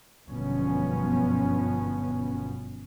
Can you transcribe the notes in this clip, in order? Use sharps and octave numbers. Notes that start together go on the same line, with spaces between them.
G1 F#2 B2 F3 B3 C#4